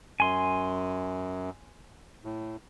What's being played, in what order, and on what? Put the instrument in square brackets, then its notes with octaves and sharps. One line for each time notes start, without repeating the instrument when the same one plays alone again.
[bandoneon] F#2 [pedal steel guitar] G#5 C6
[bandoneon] A2